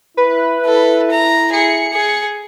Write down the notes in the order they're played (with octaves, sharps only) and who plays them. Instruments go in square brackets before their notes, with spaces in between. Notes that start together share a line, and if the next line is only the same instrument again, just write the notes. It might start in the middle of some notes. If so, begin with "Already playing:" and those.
[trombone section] E4 [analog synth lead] B4
[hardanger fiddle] A4
A#5
[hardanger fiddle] G#4 [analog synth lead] C#7
[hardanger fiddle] G#4